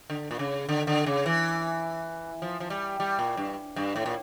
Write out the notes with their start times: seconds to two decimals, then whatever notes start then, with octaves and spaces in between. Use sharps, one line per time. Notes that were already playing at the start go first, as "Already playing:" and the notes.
0.10 D3
0.31 A#2
0.39 C#3
0.69 D3
0.87 D3
1.06 C#3
1.26 E3
2.42 F3
2.60 F3
2.70 G3
3.00 G3
3.19 A#2
3.37 G2
3.76 G2
3.96 A2
4.06 A#2